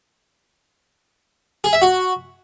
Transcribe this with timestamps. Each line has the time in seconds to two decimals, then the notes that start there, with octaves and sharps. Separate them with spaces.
1.64 G#4
1.73 E5
1.82 F#4